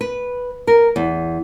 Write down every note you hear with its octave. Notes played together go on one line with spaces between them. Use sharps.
B4
A#4
E2